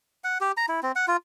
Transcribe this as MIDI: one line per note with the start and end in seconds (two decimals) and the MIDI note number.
0.24 0.38 78
0.41 0.52 67
0.57 0.66 82
0.69 0.80 64
0.83 0.92 60
0.96 1.06 78
1.08 1.17 65